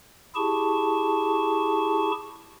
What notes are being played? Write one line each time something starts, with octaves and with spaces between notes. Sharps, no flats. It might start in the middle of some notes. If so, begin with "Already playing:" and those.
E4 G4 G#4 A5 C#6